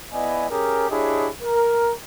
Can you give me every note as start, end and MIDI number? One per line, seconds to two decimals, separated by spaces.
0.13 0.49 59
0.13 0.49 64
0.13 0.49 74
0.13 0.49 75
0.13 0.49 80
0.50 0.88 61
0.50 0.88 67
0.50 0.88 68
0.50 0.88 70
0.90 1.29 62
0.90 1.29 64
0.90 1.29 67
0.90 1.29 68
0.90 1.29 73
0.90 1.29 75
1.43 1.92 70